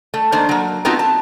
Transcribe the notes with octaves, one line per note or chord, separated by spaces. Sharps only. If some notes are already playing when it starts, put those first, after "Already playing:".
A3
D#3 A3 A#3 D4 C5
F#3 A#3
A3 B3 C4 D#4 F4 F#4
A5